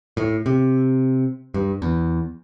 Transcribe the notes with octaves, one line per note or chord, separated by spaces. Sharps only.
A2
C3
G2
E2